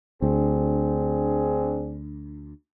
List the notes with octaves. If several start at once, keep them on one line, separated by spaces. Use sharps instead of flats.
D2 C4 D4 G#4